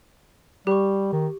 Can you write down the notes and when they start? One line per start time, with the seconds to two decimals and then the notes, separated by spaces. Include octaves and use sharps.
0.67 G3 G4 C#6
1.13 D#3